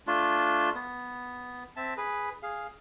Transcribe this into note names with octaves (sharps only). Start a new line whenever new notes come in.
A3 D4 F4
B3
C4 E5 A5
G#4 B4
G#4 F5